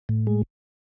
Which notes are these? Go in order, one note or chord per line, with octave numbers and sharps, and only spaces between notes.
A2
G#3